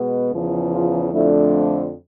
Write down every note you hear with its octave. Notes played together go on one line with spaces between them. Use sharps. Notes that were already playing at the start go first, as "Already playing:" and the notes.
Already playing: B2 G#3 B3
E2 C#3 F3
F4
F2 D3 F3 A3 D4 E4